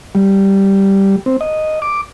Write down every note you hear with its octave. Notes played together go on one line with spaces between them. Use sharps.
G3
C4
D#5
D6